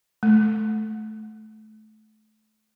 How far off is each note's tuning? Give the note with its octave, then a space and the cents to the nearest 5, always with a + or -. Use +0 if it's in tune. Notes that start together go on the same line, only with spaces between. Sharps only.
A3 -25